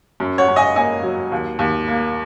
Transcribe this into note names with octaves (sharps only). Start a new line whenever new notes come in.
F#2
C#5 F#5
F#2
D#5 G#5
A#3 D#5 G#5
F#3
D#2
D#2
A#3